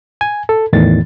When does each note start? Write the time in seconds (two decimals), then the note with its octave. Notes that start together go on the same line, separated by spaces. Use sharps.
0.21 G#5
0.49 A4
0.73 E2 A2 D#3 A6